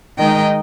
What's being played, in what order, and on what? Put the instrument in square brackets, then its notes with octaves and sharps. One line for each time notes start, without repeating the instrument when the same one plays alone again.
[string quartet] D#3 G#3 D#4 D#5 G5